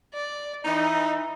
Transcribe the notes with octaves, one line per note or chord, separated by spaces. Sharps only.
D5
E3 D#4